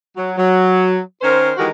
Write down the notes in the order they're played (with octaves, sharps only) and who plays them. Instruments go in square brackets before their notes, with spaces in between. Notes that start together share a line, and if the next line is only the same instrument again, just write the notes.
[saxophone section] F#3
F#3
D#3 C#4 A#4 C5
D#3 E3 G#3 F#4 G4 A#4